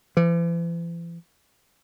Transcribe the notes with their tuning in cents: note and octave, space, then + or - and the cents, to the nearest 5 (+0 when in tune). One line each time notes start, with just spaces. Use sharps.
E3 +45